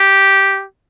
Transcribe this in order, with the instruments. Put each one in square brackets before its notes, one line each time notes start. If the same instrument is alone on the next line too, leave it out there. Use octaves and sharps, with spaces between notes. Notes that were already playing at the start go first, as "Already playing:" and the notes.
Already playing: [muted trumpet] G4